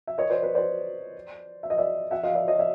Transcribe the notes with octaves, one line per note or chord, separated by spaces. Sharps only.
E5
C#5 D#5
C5 D5
B4 C#5
C5 D5
E5
D#5
D5 E5
E5 F#5
D#5 F5
D5 E5
C#5 D#5
D5 E5